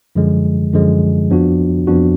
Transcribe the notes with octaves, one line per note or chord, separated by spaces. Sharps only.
F#2 D3 F3 G#3
F#2 D3 F3 G#3
F2 F3 B3 D4 F#4
F2 F3 B3 D4 F#4